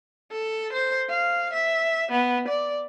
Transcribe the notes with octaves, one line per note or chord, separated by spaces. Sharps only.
A4
C5
F5
E5
B3
D5